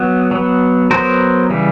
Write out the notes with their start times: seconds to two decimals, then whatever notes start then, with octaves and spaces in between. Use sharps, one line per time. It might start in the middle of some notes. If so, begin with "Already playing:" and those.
Already playing: F#3 B3
0.31 F#3 B3
0.91 F#3 B3 A#4 C5
1.50 C#3 E3 G3